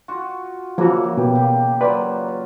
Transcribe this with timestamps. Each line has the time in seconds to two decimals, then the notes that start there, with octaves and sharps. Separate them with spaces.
0.08 F4 F#4 C#6
0.78 C#3 E3 F3 A#3 F#4
1.17 B2 G4
1.35 A#3 G4
1.81 F#3 A#3 F4 B4 D5